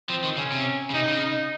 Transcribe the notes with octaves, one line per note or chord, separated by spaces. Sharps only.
F3 C4
D#3
C#3 C#4
C3
C#3
C3 D#4
C#3
D#4